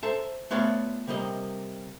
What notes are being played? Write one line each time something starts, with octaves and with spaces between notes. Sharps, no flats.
A4 C5 E5 A5 A#5
A3 B3 F4 C#5 D5 F5
C3 G3 A#3 D#5